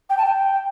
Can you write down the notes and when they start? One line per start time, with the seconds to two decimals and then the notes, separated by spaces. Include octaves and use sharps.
0.10 G5
0.18 A5
0.26 G5